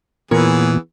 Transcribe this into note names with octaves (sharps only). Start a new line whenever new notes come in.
E2 A#2 E3 B3 F4 G#4 A#4 C#5